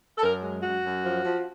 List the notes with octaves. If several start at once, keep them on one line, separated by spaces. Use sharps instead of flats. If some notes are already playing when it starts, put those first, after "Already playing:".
A4
F#2 A#4
G#3
F#2 F#4
F#2
F3
F3